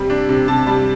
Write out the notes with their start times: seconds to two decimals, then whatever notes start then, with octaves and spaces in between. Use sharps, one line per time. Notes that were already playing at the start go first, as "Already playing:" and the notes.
Already playing: C3 G3
0.10 D4
0.29 C3
0.48 C3 A5
0.67 G3 A5